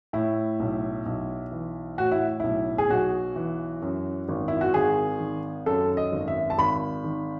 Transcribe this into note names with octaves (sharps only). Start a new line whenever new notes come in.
A2 E4
B1
B1
E3
A2 F#4
E4
B1 E4
G#4
B1 F#4
E3
F#2
G#1
E4
F#4
G#1 G#4
D#3
F#2 A4
D#5
G#1
E5
A5
G#1 B5
D#3